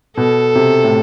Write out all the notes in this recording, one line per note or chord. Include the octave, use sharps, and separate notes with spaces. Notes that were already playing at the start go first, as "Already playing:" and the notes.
B2 A4
C3
A2